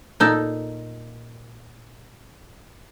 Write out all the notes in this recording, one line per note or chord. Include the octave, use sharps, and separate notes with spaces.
A#2 D#4 A4